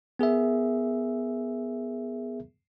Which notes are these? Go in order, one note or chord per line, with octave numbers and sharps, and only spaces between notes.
B3 G#4 A#4 E5